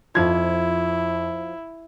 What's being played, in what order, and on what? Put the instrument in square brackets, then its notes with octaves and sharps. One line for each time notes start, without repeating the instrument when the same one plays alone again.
[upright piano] F2 G#6 [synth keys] F3 F4 [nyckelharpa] E4